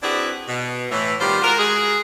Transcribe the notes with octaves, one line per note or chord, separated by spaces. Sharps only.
C4 D4 E4 F#4 G#4 B4
B2
A2 E3
D#3 G3 B3 F4 G4 C5
G#3 F4 F#4 A#4
G#3 F#4 G#4